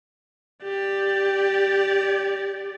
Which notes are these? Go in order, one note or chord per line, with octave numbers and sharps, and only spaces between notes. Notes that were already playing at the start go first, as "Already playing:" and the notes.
G4 D5